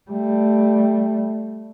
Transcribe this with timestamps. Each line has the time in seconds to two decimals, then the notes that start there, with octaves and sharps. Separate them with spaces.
0.10 G3 A3